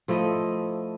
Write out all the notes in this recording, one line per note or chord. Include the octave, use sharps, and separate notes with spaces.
F3 A3 E4 D#5